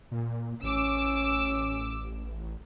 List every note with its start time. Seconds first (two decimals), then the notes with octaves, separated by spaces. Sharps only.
0.12 A#2
0.63 A1 C#4 D6 E6